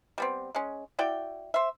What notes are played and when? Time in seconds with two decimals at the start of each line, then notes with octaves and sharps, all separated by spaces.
0.18 G3 B3 C4
0.55 G#3 C#4
0.99 E4 F#4 D5 G5
1.54 C5 E5